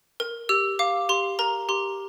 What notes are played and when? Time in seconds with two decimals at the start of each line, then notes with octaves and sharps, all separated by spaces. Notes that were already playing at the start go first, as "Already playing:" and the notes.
0.20 A#4
0.49 G4 E6
0.79 F5 D6
1.09 G4 C6
1.39 A#4 A#5
1.69 G4 C6